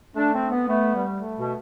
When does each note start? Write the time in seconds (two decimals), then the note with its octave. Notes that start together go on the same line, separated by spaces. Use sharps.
0.15 A3 D4
0.33 C4
0.50 B3
0.67 A3 B3
0.95 G3
1.20 A3
1.38 B2